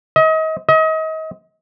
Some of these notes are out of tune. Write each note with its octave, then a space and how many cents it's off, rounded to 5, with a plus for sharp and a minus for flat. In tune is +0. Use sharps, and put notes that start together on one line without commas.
D#5 +35
D#5 +35